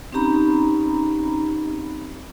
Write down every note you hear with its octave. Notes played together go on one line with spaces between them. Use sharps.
C4 C#4 D#4 G4 A#5 B5